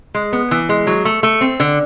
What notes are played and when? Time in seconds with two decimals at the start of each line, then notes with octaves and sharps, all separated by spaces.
0.15 G#3
0.33 B3
0.51 E3
0.69 G#3
0.87 F#3
1.05 A3
1.23 A3
1.41 C4
1.60 D3